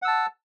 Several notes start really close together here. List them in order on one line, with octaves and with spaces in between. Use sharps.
F#5 E6 A5